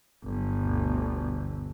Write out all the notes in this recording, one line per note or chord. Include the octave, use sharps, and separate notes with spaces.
G1 F#3
D2 G2 B2